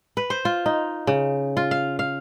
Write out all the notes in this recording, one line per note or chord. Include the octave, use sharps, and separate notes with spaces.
B4
C5
F4
D#4
C#3
F4
F5
F5